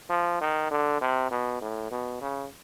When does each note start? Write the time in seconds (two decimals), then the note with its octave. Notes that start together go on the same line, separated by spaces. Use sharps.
0.10 F3
0.41 D#3
0.71 D3
1.01 C3
1.31 B2
1.61 A2
1.91 B2
2.21 C#3